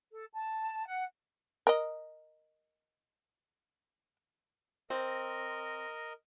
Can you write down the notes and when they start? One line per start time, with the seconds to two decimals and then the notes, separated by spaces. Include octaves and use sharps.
0.12 A4
0.32 A5
0.87 F#5
1.67 A#4 D#5
4.90 C4 A#4 D#5